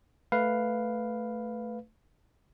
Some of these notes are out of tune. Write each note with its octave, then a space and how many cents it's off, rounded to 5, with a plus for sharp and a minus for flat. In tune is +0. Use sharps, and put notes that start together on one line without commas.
A3 +0 B4 +0 F5 +0